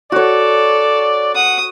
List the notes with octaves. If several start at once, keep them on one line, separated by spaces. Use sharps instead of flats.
F#4 A4 C#5 D5
F#5 D#6